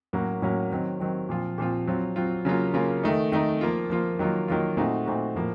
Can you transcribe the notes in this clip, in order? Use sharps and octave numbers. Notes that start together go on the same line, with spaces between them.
A2 F#3 A#3 C#4 F#4
A2 F#3 A#3 C#4 F#4
D#3 F#3 C4
D#3 F#3 C4
A#2 F3 C4 F4
A#2 F3 C4 F4
F#3 C4 F4
F#3 C4 F4
C#3 F#3 A#3 F4
C#3 F#3 A#3 F4
D#3 A3 D#4
D#3 A3 D#4
F3 A#3 F4
F3 A#3 F4
D#3 F#3 A#3 F4
D#3 F#3 A#3 F4
A#2 A3 C4 D#4 F#4
A#2 A3 C4 D#4 F#4
A2 F3 A#3